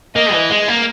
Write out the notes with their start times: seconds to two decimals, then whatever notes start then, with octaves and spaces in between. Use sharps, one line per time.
0.15 A#3 D#5
0.33 E3
0.50 G#3
0.68 A#3